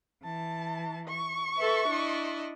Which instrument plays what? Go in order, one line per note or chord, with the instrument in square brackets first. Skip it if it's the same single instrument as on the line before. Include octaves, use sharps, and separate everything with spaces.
[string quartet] E3 [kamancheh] A5
[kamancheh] C#6
[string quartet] A4 B4 E5
D4 E4 D#5